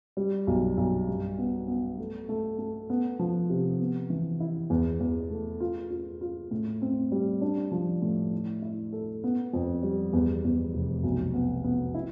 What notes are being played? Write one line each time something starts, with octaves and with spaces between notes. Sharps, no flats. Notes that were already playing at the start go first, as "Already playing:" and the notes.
G3
B1
B1
G2
B3
B3
A3
A3
A3
B3
F3
C3
B3
E3
E4
E2
E2
A3
F4
F4
F4
A2
C4
G3
D4
F3
A2
E4
E4
A4
B3
F2
G3
E2
E2
F1
B1
B3
B3
E4